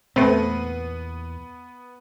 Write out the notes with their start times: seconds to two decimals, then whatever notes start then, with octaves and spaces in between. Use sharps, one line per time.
0.16 E2 A#2 A3 B3 C4 B4